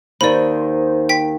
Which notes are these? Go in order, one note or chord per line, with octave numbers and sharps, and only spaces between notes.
D#2 D#3 C5 D5 B5
G5 B6